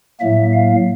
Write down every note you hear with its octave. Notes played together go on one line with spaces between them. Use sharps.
A2 F#3 A#3 E5
F5